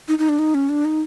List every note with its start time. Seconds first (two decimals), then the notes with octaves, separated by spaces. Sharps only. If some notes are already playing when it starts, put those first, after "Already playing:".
0.08 D#4
0.19 D#4
0.29 D4
0.39 D#4
0.54 C#4
0.69 D4
0.85 D#4